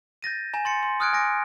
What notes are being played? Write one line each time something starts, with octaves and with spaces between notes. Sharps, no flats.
G6 A6 A#6 D#7
G#5 A#5
C6 A6 C#7
C6
D#6 F6 F#6 G#6 D7
G#5 D6 A#6 D7